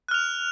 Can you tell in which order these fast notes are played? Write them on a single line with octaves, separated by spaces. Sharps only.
F#6 F6 F7